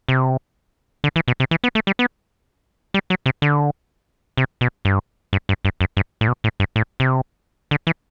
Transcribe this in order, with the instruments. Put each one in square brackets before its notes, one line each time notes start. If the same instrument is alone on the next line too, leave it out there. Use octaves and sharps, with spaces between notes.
[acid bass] C3
D3
E3
B2
C3
E3
B3
A3
G3
B3
G3
F#3
C3
D3
C3
B2
G2
G2
G2
G2
F#2
G2
A2
B2
A2
G2
A2
C3
D3
E3